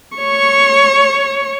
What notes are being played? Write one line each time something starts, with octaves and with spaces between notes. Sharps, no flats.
C#5 C#6